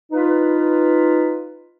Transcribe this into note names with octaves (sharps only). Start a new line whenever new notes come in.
D#4 F4 B4